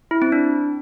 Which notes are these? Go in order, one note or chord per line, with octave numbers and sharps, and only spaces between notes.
E4
C4
D4